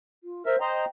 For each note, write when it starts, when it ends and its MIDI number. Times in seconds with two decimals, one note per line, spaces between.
0.24 0.45 65
0.46 0.56 70
0.46 0.59 72
0.46 0.56 76
0.61 0.85 72
0.61 0.85 75
0.61 0.84 79
0.61 0.85 82